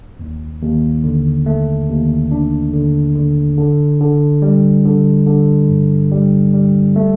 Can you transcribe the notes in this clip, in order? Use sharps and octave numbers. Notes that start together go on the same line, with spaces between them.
D#2
D#2
D3
A3
D#2
D4
D3
D3
D3
D3
G3
D3
D3
G2
G3
G3
A3